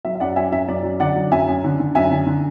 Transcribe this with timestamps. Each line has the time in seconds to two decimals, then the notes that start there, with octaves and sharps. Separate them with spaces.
0.05 F#3 E5
0.15 E5
0.20 F#2 D5 F#5
0.36 F#3 E5 G#5
0.52 F#2 E5
0.68 F#2 D5
0.83 F#3
1.00 D3 D5 F#5
1.15 F#3
1.32 F#2 E5 G#5
1.48 F#2
1.64 D3
1.79 D3
1.95 F#2 E5 G#5
2.11 D3
2.27 D3